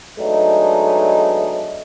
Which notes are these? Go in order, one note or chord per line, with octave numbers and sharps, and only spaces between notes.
F#3 G#3 A3 B3 D4 D#4